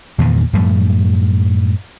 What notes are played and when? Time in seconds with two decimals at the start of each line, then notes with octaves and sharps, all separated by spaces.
0.18 E2 G2 A#2 D#3
0.53 F#2 A2 F3 G3